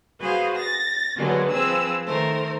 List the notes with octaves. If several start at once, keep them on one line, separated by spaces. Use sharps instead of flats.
F#4 G#4 B4 C5 F5
A6 A#6
D3 F#3 G#3 A#3 B3
F3 C4 G#4 B4 E6
D#3 A3 A#4 C5